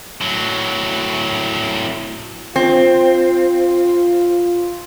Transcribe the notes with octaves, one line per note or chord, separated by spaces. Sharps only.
A2 F#3
C4 F4